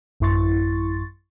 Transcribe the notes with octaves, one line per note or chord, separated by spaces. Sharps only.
A1 F#2 E4 C6 C#6 A6